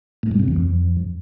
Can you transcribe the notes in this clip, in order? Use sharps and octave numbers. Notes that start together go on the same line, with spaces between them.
A2
G2
C3
E2
F2